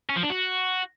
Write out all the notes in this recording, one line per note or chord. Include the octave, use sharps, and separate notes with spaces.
C#4
F3
D4
F#4